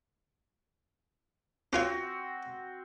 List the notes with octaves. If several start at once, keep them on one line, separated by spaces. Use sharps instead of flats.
C4 C#4 F4 F#4 C#5